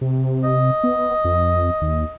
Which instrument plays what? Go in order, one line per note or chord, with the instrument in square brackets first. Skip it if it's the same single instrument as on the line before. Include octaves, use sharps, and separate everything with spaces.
[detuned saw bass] C3
[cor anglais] D#5
[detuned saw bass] B3
F2
D#2